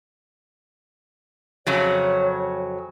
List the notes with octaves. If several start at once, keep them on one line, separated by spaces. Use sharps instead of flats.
F2 C#3 F#3 C#5